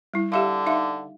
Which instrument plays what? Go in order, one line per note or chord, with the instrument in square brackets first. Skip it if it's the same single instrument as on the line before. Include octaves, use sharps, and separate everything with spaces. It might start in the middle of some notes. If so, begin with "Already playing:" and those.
[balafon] G3 E4
[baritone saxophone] D3 [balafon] G4 E5 F5
[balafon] D#4 E5 F5